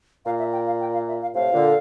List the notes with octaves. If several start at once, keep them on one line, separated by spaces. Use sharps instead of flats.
A#2 F5
E5
G5
F5
G5
F5
E5
F5
A2 C3 F5
A#2 D3